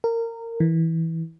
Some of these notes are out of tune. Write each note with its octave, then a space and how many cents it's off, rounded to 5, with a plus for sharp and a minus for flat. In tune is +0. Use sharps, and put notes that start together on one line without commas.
A#4 -20
E3 -15